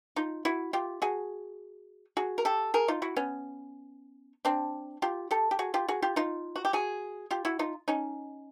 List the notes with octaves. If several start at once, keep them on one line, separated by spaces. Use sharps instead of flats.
D#4 F4
E4 F#4
F4 G4
F#4 G#4
F#4 G#4
A#4
G4 A4
G#4 A#4
D#4 F4
E4 F#4
B3 C#4
C4 D4
F4 G4
G4 A4
G4
F#4 G#4
F4 G4
F#4 G#4
F4 G4
D#4 F4
F#4
G4
F#4 G#4
F4 G4
E4 F#4
D#4 F4
C#4 D#4